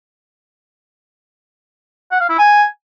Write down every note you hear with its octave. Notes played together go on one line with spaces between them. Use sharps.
F#5
F5
E4
G#5